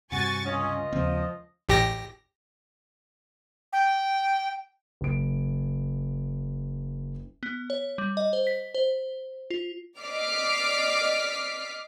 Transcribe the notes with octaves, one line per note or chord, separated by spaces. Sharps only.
G2 C3 F#4 G#5 C#6 A6
C#2 C#4 F4 D#5
D#2 C#3 F3 C4
A1 G4 A#6
G5
F#1 D7
B3
C#5
G3
D#5
C5
B6
C5
F4
D5 D#5 D6 F6 B6 C7